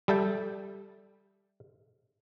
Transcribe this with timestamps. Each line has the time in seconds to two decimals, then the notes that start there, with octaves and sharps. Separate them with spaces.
0.08 G3 A4 E5 G5